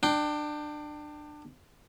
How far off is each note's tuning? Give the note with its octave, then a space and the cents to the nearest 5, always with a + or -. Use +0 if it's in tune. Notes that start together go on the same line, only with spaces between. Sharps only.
D4 +25 G5 +0